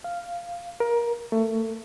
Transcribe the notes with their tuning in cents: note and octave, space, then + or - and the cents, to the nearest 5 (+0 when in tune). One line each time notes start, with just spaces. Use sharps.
F5 -5
A#4 +20
A3 +25